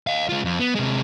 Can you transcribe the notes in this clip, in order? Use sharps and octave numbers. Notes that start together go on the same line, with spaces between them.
D#5 F5
G#3 F4
F2
B3
C3 G#3